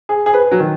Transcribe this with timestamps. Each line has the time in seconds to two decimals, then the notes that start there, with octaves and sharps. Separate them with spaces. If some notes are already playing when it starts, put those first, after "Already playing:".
0.09 G#4
0.26 G#4
0.34 B4
0.51 F#3
0.60 D#3